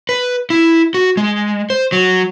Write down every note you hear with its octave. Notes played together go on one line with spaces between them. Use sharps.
B4
E4
F#4
G#3
C5
F#3